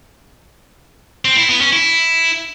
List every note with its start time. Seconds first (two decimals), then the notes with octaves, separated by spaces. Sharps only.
1.25 C4
1.37 E4
1.49 B3
1.61 C#4
1.73 E4